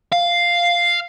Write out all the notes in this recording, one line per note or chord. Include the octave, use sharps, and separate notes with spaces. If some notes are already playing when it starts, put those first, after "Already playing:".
F5